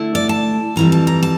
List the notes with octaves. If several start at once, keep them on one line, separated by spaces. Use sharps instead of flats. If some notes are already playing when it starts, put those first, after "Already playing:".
Already playing: D3 A3 E4
D5
A5
F2 E3 G3 A#5
A5
A#5
A5